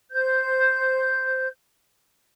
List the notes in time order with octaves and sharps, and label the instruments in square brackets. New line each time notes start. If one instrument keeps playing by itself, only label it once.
[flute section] C5 G6